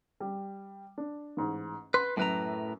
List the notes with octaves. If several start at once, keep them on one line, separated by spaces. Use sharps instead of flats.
G3
D4
A1 G#2
B4 C6
F#2 A2 B4 A#5